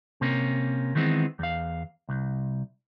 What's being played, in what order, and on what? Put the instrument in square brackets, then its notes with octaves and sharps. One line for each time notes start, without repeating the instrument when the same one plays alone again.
[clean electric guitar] C3 A#3 C#4
D#3 E3 G#3 B3 C4
E2 F5
C2